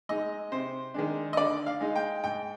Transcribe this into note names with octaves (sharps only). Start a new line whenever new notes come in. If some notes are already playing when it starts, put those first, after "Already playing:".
G#3 D#4 D#5
C3 C5
D#3 G#3 D4
D#5
D3 D5
F5
G#3 D#4
G5
G#2 G5